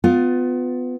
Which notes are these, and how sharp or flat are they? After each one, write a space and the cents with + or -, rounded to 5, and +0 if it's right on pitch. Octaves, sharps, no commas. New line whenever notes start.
B3 +25 F4 +15